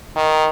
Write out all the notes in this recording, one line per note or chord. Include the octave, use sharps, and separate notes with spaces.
D#3